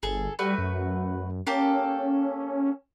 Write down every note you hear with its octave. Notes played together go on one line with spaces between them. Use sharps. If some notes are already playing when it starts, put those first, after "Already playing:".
G1 G#4 A4
G3 A3 F#4 B4
F#2
A#3 C#4 G4 A4